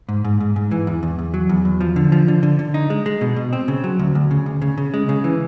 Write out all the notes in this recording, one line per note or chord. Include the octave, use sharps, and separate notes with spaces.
G#2
G#2
G#2
G#2
E3
E2
E2
E2
F#3
E2
E2
F3
D3
F3
D3
D3
D3
D#4
G#3
G#3
B2
B2
C4
C#3
F#3
D2
D2
C#3
D2
C#3
C#3
G#3
C#3
E3